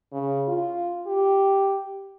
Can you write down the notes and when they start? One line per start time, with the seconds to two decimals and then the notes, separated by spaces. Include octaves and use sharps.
0.12 C#3
0.48 F4
1.06 G4